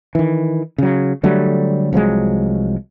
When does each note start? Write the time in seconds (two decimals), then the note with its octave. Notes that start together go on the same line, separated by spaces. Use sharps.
0.15 D#3 E3
0.78 C#3 F#3
1.23 D3 F#3 G3 A3
1.93 C2 F3 F#3 G#3